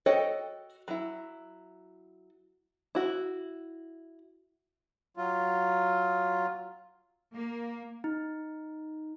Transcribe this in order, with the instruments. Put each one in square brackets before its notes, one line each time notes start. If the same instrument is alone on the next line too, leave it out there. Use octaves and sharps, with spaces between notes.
[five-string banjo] F#4 A4 C#5 D#5 G5
F#3 E4
E4 F#4
[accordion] F#3 F4
[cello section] A#3
[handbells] D#4